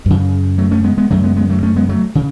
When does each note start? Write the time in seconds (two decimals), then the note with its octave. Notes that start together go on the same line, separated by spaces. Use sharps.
0.06 F#2 C#3
0.58 F#3 A3
0.71 A3 C#4
0.84 G#3 B3
0.98 G#3 B3
1.10 F#2 C#3 F#3 A3
1.23 G#3 B3
1.37 G#3 B3
1.50 F#3 A3
1.63 A3 C#4
1.76 G#3 B3
1.89 F#3 A3
2.15 C#3